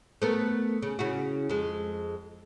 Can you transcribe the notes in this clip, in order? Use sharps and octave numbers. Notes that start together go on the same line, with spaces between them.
A3 B3 A#4
C#3
C#3 E4 F#4
F2 G#3